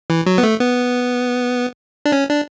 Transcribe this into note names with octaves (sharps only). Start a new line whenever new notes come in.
E3
F#3
B3
A3
B3
D4
C#4
D4